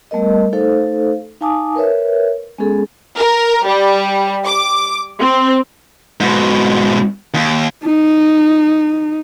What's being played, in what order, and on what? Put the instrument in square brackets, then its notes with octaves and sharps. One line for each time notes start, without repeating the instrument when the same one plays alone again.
[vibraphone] G3 A3 B3 A#4 D#5
A3 D#4 A4 C5 F5
D#4 F5 G#5 A5 D6 D#6
A#4 B4 C#5 E5
G#3 B3 C#4 G#4 A4
[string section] A#4
G3
D6
C4
[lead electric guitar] G#2 B2
D#2
[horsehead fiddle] D#4